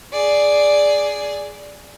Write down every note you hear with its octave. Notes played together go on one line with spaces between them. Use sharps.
G#4 D5